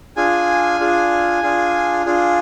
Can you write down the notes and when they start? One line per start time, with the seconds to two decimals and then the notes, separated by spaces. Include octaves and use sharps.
0.17 D4 F4 G#4 G#5
0.80 D4 F4 G#4
1.43 D4 F4 G#4
2.06 D4 F4 G#4